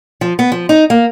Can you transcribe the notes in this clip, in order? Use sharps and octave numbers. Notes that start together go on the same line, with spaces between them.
F3
B3
F3
D#4
A#3